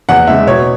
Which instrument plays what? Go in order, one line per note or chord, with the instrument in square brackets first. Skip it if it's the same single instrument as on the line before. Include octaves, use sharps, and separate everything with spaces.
[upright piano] E2 F#5
C#3 G#3 E5
B2 C#5